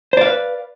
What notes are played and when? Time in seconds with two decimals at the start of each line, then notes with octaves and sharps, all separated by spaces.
0.13 C5
0.17 D5
0.21 F5
0.25 B4